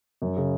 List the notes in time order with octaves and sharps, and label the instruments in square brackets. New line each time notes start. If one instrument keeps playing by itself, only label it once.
[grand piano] F#2
C#3